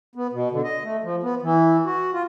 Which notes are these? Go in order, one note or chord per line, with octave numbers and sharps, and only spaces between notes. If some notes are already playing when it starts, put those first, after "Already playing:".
B3
B2
D3
D#5
A3
F3
B3
E3
F#4
F4